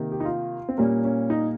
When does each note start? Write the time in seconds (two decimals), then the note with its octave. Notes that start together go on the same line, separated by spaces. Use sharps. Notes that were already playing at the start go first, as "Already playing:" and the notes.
Already playing: C3 D#3 A#3
0.12 G4
0.20 D#4
0.25 F4
0.69 C4
0.78 A#2 G3 A#3 C#4
1.04 C#4
1.30 D#4